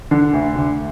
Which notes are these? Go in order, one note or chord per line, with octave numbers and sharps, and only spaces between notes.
D3
D2
D2